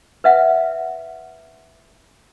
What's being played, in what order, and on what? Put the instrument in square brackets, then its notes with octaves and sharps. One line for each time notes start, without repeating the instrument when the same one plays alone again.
[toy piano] B4 E5 F#5